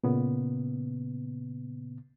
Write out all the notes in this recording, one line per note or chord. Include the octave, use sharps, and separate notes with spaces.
A#2 C#3 B3